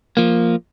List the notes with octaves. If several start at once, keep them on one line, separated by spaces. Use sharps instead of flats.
F3 A#3